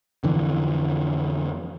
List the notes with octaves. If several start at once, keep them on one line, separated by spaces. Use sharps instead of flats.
F2 D3 E3